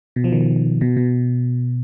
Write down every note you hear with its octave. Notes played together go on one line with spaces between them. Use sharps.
B2
F3
D#3
B2
B2